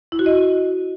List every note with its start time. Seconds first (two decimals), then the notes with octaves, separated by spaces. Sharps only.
0.12 E4
0.19 F#4
0.26 D#5